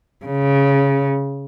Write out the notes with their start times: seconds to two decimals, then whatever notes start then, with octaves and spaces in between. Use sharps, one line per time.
0.26 C#3